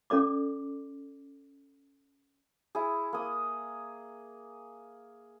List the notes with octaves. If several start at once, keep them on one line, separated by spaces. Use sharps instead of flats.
C#4 A4 D5 D6
E4 G#4
A#3 D#6